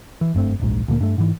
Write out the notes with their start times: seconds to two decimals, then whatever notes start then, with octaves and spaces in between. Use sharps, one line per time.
0.21 E3
0.34 F#1 G2 A3 C4
0.59 D1 A#1 G#2
0.88 D2 A#2 F3 A#3
1.00 G2 A3
1.18 G#2 E3